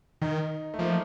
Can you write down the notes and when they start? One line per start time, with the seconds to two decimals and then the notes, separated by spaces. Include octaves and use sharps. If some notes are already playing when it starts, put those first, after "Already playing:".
0.22 D#3 D#4
0.74 A3
0.79 F3 A#3